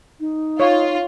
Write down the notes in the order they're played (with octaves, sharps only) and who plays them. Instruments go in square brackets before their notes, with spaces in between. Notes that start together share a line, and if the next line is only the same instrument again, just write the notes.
[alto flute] D#4
[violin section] F4 [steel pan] C#5